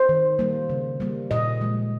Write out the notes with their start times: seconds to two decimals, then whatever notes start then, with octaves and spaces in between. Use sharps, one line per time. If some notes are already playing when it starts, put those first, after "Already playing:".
Already playing: C5
0.09 D#3
0.39 G3 A#3
0.70 C#3
1.00 G3 A#3
1.31 A#2 D#5
1.61 F3 G#3